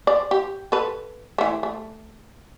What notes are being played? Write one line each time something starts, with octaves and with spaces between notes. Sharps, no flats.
D5
G4
A4 B4
E3 A3
A3